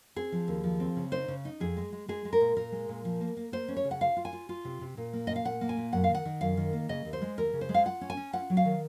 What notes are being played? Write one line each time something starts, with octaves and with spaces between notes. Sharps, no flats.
C4 G#4
F3
D#2
F3
C4
C#3
D#4 C5
C#3
D#4
F2 G#4
G#3
G#3
G#3 G#4
G#3
A#4
A#2
A#2 A#4
G#3
A#2
F3
A#3
A#3
A#3 C5
C#4
C#5
C#3
F#5
F4 F5
F4
G#5
F4
F4
C3
C3
A#2
A#3
A#2 D#5
F5
A#2 F#5
A#3
G#5
A#2
F#2 F#5
F5
D#3
F#5
D#3
F#2 F5
D#3
A#3
C#3 D#5
D#2
C5
G#3
D#2 A#4
C#3
C5
G#3
F5
F4 F#5
C#4
G#5
C#4
F4 F#5
F#3
F5
D#3